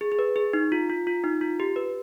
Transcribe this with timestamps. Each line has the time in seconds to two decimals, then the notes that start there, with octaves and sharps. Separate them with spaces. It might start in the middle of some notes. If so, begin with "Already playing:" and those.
0.01 G#4
0.12 G#4
0.19 B4
0.36 G#4
0.53 D#4
0.72 F4
0.90 F4
1.07 F4
1.24 D#4
1.41 F4
1.60 G4
1.76 B4